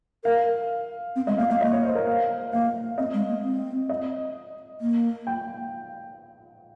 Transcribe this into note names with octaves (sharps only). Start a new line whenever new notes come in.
A#4 F5
C4
G#3 D#5
A#3 F5
A#3 F5
A#3 D#5
C#5
C5
A#4
F5
A#3 F5
C4 D#5
G#3
A#3
C4
D#5
A#3
G5